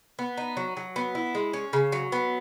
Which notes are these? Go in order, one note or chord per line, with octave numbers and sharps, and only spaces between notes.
B3
D#4
F#3
F#3
B3
E4
G#3
C#4
C#3
F#3
B3